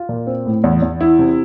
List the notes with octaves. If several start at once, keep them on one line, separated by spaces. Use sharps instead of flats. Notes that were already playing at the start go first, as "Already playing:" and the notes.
Already playing: F4
A#2
C4
A2
E2
E2
E4
C3